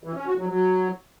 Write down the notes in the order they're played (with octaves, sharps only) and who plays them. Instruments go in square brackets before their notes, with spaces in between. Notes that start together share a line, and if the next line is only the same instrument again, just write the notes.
[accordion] E3
C#4
F#4
F#3
F#3